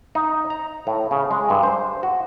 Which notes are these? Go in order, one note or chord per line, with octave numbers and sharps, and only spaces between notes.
D#4
A#5
A2
C#3
G#3
G2
C5
F#4